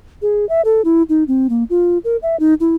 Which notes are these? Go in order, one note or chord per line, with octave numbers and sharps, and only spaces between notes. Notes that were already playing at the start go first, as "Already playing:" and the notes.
G#4
E5
A4
E4
D#4
C4
A#3
F4
A#4
E5
D#4
E4